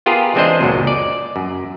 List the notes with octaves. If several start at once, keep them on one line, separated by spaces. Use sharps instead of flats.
B3 F4 G4 G#4 A#4
E3 G#3 C4 D4 C5 D#5
C#2 F#2 A#2 F#3
D5
F#2